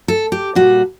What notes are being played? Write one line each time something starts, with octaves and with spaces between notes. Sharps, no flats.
A4
G4
A#2 G3 F#4